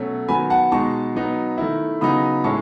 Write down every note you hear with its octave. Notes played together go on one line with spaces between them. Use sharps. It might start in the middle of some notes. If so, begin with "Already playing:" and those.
Already playing: B2 F#3 A3 C#4
D#3 F#3 B3 G#5 B5
F#5 A5
B2 G#3 D#4 A5 C#6
F#3 B3 D#4
D#3 A3 E4
C#3 F#3 B3 D#4 B5 D#6
A2 G#3 C#4 E4 A5 C#6